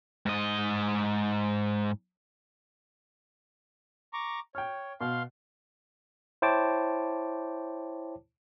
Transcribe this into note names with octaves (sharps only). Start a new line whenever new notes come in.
G#2 D#5
A#5 C#6 D6
C#5 G5 F6
B2 F5 C6
E4 C5 C#5 G5 A5 D6